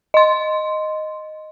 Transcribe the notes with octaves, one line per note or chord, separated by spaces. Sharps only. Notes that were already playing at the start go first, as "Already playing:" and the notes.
D#5 C6